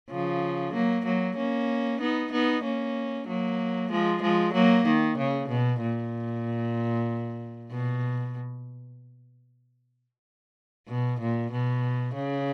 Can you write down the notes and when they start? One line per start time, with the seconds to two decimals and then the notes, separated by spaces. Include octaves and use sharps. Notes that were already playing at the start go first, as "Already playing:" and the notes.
0.10 C#3 F3
0.74 F#3 A#3
1.05 F#3 A#3
1.37 A#3 C#4
2.00 B3 D#4
2.32 B3 D#4
2.64 A#3 C#4
3.27 F#3 A#3
3.91 F3 G#3
4.22 F3 G#3
4.54 F#3 A#3
4.86 D#3
5.17 C#3
5.49 B2
5.81 A#2
7.71 B2
10.88 B2
11.20 A#2
11.52 B2
12.15 C#3